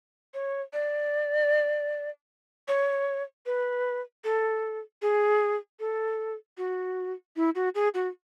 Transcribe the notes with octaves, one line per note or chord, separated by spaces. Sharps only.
C#5
D5
C#5
B4
A4
G#4
A4
F#4
E4
F#4
G#4
F#4